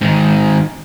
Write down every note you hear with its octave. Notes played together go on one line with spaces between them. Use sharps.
G#2 D#3